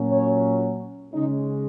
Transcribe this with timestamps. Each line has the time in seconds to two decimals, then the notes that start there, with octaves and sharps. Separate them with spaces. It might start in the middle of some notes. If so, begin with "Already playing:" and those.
Already playing: A#2 F#3 C#4
0.11 C#5
1.13 C#3 G#3 C#4 D#4